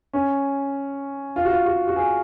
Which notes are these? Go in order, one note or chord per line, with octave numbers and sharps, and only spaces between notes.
C#4
F4
F#4
F4
F#4
F#4
G#4